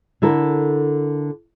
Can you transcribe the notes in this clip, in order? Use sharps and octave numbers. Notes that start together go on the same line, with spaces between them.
D3 E4 A4 A#4